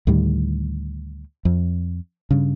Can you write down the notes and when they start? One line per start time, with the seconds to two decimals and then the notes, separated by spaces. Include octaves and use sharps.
0.07 D2 A2 D#3 G3
1.45 F2
2.31 G2 C#3